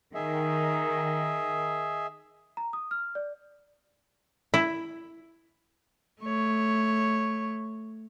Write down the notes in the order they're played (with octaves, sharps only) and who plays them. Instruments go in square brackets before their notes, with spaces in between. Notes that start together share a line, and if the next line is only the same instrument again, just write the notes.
[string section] D#3 [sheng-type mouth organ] G#4 D#5 E5
[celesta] A#5
D#6
F6
D5
[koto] E4
[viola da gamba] A3 C#5